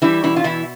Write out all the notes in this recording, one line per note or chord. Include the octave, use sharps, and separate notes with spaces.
E3 G3 E4
B2 E3 E4
F4
B2 E3 E4